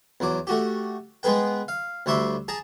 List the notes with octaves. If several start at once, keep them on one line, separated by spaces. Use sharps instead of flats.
E2 F#3 D6
A3 F#4 G4
G#3 B3 G#4 B4 G5
F5
D2 G3 C#5 E5 C6 D6
G#4 A5 A#5